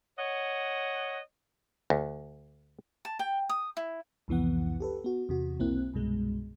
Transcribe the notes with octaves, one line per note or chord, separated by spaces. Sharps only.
C#5 D#5 F#5
D2
A5
G5
D#6
E4
C2 F2 E3 B3 F#5
G4 A4 B4
B3 F#4
E2 C3 F#4
B1 A#3 C4 E4 F#6
C2 G2 B2 G#3